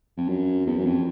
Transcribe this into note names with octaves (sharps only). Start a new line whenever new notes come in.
F2
F#2
E2
F#2
F2